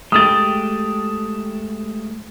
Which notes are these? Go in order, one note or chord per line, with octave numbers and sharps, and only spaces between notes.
G#3 A3 G4 D#6 A6